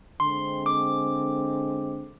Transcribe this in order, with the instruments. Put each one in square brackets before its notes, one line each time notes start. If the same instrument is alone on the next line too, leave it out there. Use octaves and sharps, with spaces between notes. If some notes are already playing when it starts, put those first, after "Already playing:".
[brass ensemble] D3 G#3 C4 [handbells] C6
[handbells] D6